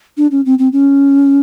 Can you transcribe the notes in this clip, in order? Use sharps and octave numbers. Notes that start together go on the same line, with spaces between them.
D4
C#4
C4
C4
C#4